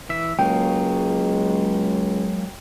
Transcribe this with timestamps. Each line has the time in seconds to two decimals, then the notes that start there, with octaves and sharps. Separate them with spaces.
0.09 E3 E5
0.39 C#2 F#3 G#3 A#3 G5